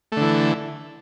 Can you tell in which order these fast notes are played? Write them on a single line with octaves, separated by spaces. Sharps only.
A3 D3 E3